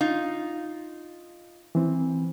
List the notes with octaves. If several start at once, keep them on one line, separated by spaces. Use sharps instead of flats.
D#4 F4
E3 C4